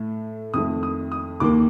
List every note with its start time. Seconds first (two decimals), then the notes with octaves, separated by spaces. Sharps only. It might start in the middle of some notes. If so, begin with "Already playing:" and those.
Already playing: A2 A3
0.54 F2 D#3 A3 D#6
0.83 D#6
1.12 D#6
1.40 D#2 D#3 A#3 D6